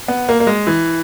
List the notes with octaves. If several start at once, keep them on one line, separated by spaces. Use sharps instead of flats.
B3
A#3
A#3
G#3
E3